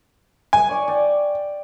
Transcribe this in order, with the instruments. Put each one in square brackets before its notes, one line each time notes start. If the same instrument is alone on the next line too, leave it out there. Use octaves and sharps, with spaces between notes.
[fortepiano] G#5
[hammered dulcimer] C#5 D5 C#6
D5 G5